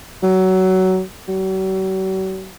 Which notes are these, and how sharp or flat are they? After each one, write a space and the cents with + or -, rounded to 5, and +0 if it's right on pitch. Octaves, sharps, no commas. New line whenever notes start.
F#3 +20
F#3 +45